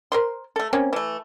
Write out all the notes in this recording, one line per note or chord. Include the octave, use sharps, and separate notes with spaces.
A#4 C5 C6
A3 A4
A#3 C4 C#4
E3 A3